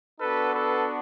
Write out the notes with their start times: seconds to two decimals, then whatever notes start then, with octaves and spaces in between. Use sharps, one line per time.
0.21 B3 D4 F#4 A4 B4
0.54 A4 B4